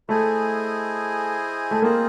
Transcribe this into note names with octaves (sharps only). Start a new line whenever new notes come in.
A3 E4 G#4 C5 D#5 G#5
A3
A#3 C4 F4 G#4 C5 D#5